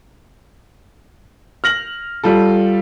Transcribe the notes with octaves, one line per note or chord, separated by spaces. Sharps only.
F6 A#6 F#7
G3 F4 A4